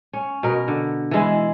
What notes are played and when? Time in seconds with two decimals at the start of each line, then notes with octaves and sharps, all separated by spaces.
0.13 C#4
0.43 B2 A#4
0.68 D3
1.11 E3 G#3 E4